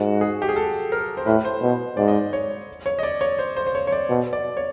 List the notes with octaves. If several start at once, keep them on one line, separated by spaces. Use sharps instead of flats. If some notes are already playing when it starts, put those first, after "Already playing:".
Already playing: G#2 F#4
G#4
G4
G#4
A4
A#4
C5
A2 B4
C5
B2
G#2 D5
D#5
D5
C#5
C#5
D#5
D5
C#5
C5
C5
C5
C#5
C#5
D5
B2
D5
C#5